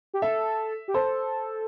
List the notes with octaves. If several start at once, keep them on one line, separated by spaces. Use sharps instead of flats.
G4
A4 E5
G4
A4 C5